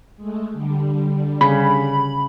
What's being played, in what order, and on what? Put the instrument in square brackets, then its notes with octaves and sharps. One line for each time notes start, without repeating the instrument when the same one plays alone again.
[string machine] G#3 A3
D3 G3
[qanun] C#3 [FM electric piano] B5